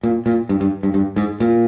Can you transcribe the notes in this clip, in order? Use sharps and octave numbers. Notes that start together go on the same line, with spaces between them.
A#2
A#2
G2
G2
G2
G2
G#2
A#2